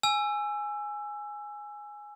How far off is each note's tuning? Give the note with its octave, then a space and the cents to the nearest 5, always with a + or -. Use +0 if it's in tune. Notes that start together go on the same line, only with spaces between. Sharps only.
G#5 +0 E6 +15